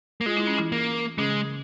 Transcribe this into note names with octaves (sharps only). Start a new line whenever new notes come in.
A#3
G#3 F4
E4
C#4
E3 E4
A#3
C#3 G#3 C#4